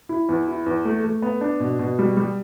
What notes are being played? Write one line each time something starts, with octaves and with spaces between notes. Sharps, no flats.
E4
E2
E4
E2
A3
A3
B3
D4
B2
B2
G3
G3